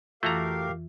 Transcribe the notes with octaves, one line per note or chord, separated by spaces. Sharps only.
F2 E3 A3 F#4 G4 A#4 F5 A#5